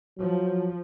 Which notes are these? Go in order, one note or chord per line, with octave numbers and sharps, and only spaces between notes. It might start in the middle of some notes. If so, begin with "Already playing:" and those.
F3 F#3